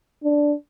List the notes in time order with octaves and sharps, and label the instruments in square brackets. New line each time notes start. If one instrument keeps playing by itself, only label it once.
[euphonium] D4